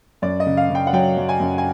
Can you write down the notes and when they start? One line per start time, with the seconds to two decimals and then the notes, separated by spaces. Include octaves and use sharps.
0.22 F#2 D5
0.40 D#5
0.46 C#3
0.57 F5
0.70 C#3
0.75 G5
0.87 F#5
0.93 F#3 G5
1.17 F#2
1.29 G#5
1.40 F#2
1.58 G#5